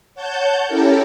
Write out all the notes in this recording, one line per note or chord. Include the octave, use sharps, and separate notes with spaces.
C#5 F#5 A5 G6
C#4 E4 G4 A4 A#4